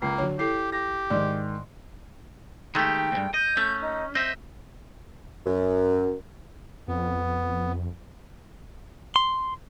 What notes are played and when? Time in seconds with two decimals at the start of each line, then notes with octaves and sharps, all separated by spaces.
0.02 C#2 A#3 A#5 C7
0.18 D3 F#3 C#5
0.39 E4 G4 A4 C7
0.72 G4 A#6
1.10 G#2 D#3 D5
2.75 D#3 G#3 A3 G4 G5
3.12 D2 G2
3.34 D#5 G6
3.57 A3 C#4
3.81 D#4
4.15 C4 D#5 E5 G6
5.46 F#2
6.88 F2 B3
9.16 C6